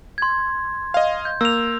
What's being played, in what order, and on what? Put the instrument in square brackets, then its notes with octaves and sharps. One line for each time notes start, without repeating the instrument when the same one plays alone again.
[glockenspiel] C6 G#6
[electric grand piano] D#5 F5
[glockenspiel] G6
[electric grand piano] A#3 [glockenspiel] E6 F7